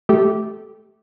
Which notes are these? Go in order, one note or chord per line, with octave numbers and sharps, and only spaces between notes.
A3 G4 A4